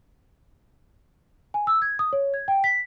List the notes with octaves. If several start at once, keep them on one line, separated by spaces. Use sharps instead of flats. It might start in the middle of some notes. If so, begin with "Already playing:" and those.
G#5
E6
G#6
D#6
C#5
G#6
G5
B6